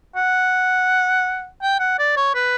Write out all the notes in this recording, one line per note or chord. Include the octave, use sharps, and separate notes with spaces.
F#5
G5
F#5
D5
C#5
B4